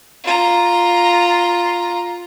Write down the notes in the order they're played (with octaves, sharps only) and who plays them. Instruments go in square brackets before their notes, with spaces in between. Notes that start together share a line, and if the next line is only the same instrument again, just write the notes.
[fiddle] F4 A#5